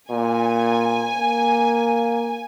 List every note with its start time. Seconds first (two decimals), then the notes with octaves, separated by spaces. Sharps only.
0.11 A#2 G#5
1.18 A#3